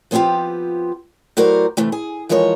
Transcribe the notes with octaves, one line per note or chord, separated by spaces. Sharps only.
F3 B3 C4 D4 F4 G4
A2 F#3 F#4 A#4 C5 D5
C3 E3 A3
G#4
E3 F3 G#3 A#4 C#5